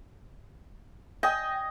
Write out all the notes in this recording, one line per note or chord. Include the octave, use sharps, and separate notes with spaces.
D#5 G5 G#5